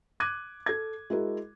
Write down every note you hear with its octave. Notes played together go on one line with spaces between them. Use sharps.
D6 F#6 G#6 D#7
A4 G#6
G#3 E4 F#4 A#4